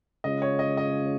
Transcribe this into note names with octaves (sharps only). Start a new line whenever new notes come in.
C#3 G#3 C#4 F4 D#5
C#5
D#5
D#5